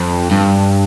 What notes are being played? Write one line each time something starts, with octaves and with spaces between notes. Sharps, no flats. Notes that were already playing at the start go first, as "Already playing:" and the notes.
Already playing: F2
G2